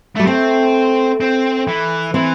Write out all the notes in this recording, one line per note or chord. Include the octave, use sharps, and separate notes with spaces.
G3 A3
A3 C4
C4
E3
E3 C4